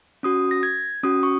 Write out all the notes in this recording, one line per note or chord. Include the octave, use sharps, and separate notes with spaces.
C#4 F#4 D#6
A#6
G#6
C#4 F#4 D#6
C#6